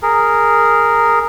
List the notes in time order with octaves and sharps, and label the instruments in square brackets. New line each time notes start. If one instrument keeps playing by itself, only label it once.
[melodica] G#4 A#4